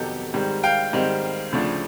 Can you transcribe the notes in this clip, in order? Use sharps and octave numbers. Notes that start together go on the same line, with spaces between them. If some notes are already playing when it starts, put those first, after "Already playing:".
Already playing: F2 C3 D#3 F#3 B3 G4 A4
G#2 D#3 G3 C4
F5 G5
G#2 D#3 G3 C4
D2 C#3 F3 A3 D4